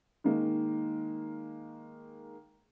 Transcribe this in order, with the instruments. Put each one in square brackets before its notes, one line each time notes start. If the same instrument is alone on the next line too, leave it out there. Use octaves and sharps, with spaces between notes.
[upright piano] D#3 G#3 A#3